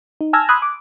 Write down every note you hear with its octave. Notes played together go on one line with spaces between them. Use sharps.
D#4
G#5 A5 E6 F6 G#6 A#6
B5 C6 D#6 E6 F#6 G#6
D6